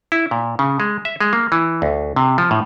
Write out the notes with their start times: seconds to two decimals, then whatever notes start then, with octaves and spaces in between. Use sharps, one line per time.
0.12 E4
0.31 A#2
0.59 C#3
0.80 G#3
1.05 E5
1.21 G#3
1.33 A#3
1.52 E3
1.82 D2
2.16 C3
2.38 F3
2.51 A2